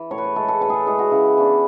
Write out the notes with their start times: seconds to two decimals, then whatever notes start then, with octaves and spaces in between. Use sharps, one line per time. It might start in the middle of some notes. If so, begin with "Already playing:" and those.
Already playing: E3
0.11 A2 C#5
0.18 B4
0.24 C#5
0.36 E3 G#3 A4
0.48 A4
0.61 A2 B4
0.70 G#4 A4
0.87 E3 G#3 G#4
0.99 F#4
1.12 C#3 E4
1.37 E3 B3 D4